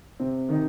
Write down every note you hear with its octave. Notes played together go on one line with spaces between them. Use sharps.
C3 C4
D#3 D#4